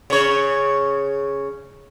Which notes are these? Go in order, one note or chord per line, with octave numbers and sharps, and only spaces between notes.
C#3 C#5